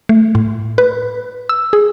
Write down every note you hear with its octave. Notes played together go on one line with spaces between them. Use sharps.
A3
A2
B4
E6
G#4